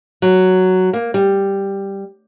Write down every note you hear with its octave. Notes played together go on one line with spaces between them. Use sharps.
F#3
A#3
G3